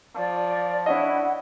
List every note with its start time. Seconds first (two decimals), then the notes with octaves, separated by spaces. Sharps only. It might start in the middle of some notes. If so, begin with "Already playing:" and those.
0.16 F3 D5
0.86 D4 E4 C#5 D#5 F#5